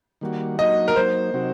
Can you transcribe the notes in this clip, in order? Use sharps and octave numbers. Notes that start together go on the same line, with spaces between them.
D#3 G3 A#3 F#4
F#3 A#3 D#4 F#4 D#5
A#4
F#3 A#3 D#4 C5
C3 F#3 C4 D#4 F#4